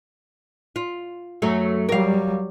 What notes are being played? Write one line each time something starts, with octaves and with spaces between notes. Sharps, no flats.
F4
F#2 F#3 A3
F#3 G3 A#4 F5